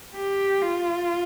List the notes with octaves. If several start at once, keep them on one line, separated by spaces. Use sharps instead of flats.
G4
F4